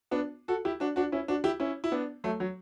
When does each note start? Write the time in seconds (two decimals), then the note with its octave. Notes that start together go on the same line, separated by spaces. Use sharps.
0.11 B3 D4
0.48 F#4 A4
0.65 E4 G4
0.80 D4 F#4
0.96 D4 F#4
1.12 C#4 E4
1.28 D4 F#4
1.44 E4 G4
1.60 C#4 E4
1.84 E4
1.92 B3 D4
2.24 F#3 A3
2.40 F#3